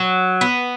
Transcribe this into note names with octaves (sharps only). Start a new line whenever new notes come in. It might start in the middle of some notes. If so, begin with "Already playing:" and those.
Already playing: F#3
B3